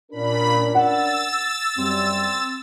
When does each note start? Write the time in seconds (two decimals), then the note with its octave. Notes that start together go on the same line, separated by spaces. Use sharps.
0.11 A#2 C#4 D4 A#4 B5
0.75 F#5 E6 A6
1.78 F#2 G3 C4